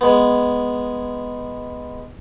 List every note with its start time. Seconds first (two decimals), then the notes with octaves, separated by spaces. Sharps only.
0.01 G#3 B3